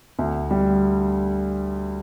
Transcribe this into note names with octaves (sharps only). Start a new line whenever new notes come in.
D2
G3